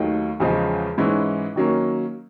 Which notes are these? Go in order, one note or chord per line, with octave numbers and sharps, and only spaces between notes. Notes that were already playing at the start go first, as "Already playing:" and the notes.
Already playing: D#2 D#3 F#3 A3
E2 C#3 F3 G#3
G#2 E3 G#3 C#4 E4
D#3 F#3 A#3 C#4